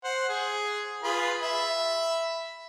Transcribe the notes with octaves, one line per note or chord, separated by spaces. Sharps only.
C5 F#5
G#4
F4 G#4 B4
E5 B5